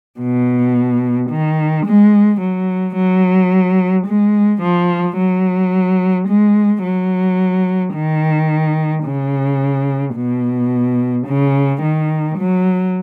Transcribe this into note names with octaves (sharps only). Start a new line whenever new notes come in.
B2
D#3
G#3
F#3
F#3
G#3
F3
F#3
G#3
F#3
D#3
C#3
B2
C#3
D#3
F#3